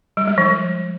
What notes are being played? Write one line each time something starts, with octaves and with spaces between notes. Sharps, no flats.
G3
G#3
F3